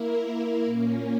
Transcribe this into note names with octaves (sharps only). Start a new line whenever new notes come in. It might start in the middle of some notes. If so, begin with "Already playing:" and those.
Already playing: A#3 E4 A#4
A#2 A#3 C#4